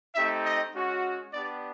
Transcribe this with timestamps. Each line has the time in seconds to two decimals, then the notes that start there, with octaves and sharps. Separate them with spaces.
0.14 A3 C4 D#4 G4 E5
0.45 D#5
0.74 G#3 C#4 F#4
1.32 B3 D4 G4 D5